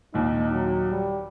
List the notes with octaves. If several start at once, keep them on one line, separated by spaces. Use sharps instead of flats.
A#1 D#2 D#4
F#3
G3